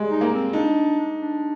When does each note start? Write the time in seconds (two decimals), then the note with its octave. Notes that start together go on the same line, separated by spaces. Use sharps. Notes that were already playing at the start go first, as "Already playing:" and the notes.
Already playing: G3 G#3
0.10 D#4
0.21 A#3
0.32 C4
0.53 D4 D#4
1.18 D4